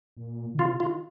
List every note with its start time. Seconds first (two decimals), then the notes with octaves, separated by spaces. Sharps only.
0.17 A#2
0.54 D#3
0.59 C3 F4
0.80 D#3 F4